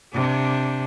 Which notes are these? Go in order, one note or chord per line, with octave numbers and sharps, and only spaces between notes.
C3 D4